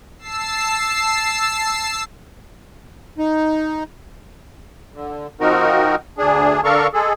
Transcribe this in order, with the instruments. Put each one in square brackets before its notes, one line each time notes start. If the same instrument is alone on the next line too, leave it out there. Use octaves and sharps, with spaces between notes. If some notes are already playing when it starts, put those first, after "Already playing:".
[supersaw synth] A5 E6 C7
[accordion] D#4
D3
F3 C4 D#4 F#4 A#4
D2 D4 G#4
D3 D4 A4 A#4 F5 C#6
G#3 G#4 A4